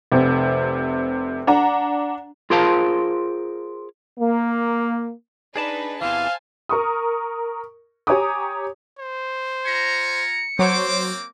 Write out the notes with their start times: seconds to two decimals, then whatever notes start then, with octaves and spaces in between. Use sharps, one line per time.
0.12 F1 C3
1.47 D4 F#5 A#5
2.50 F4 G#4 A#4 C5 F5 A5
4.19 A#3
5.56 D4 D#4 G#4 B4 D5 A5
6.01 E2 C3 E3 C5 F5 G#5 A5
6.69 A#4 C#6 D#6
8.07 G4 C#5 G#5 A#5 D6 D#6
8.99 C5
9.65 F4 G#5 A#5 C#7
10.59 F#3 A#3 C4 C5 C#5 D6